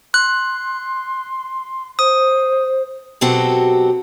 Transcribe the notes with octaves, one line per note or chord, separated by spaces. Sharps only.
C6 F#6
C5 D#6
B2 F#3 C4 F#4 G4 A4